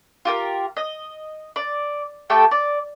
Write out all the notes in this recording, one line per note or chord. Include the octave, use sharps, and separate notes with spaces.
F4 G4 A#4
D#5
D5
A3 G4 A4 G5
D5